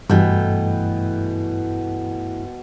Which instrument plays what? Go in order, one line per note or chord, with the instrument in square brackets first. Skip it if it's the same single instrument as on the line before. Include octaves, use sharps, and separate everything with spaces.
[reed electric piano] G2 [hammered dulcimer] B2 G5 [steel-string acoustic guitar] E3 A3